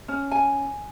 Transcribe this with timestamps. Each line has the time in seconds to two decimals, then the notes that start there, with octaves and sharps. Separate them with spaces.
0.08 C#4
0.31 G#5